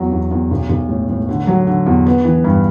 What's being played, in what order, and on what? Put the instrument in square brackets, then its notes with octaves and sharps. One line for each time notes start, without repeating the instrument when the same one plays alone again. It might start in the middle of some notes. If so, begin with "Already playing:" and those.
Already playing: [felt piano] E2 F#3
E2
E2
B1
B1
A2
A2
D3
F#3
D3
E2
B3
E3
G2